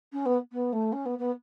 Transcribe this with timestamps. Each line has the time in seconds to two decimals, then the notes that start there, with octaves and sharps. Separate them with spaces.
0.12 C#4
0.25 B3
0.52 B3
0.72 A3
0.92 C#4
1.05 B3
1.19 B3